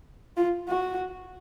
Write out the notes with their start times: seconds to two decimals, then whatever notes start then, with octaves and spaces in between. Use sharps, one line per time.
0.37 F4
0.68 F#4